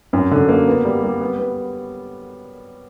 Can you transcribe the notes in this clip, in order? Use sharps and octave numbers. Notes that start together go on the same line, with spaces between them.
F#2
D3
A#3
B3
G3
G3
B3
B3